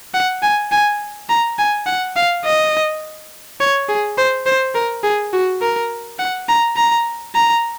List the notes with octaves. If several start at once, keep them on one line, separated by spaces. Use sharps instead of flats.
F#5
G#5
G#5
A#5
G#5
F#5
F5
D#5
C#5
G#4
C5
C5
A#4
G#4
F#4
A#4
F#5
A#5
A#5
A#5